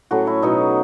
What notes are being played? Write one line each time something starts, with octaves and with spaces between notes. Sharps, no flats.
A2 F#3 A3 C#4 F#4
E4
B2 F#3 B3 D#4